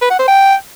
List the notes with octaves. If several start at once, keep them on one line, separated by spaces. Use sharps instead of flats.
B4
F#5
C5
G5